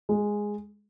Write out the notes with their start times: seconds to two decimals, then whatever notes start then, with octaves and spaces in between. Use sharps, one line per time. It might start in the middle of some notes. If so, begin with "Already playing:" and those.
0.09 G#3